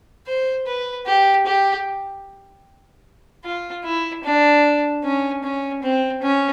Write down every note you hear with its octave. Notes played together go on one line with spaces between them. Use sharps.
C5
B4
G4
G4
F4
E4
D4
C#4
C#4
C4
C#4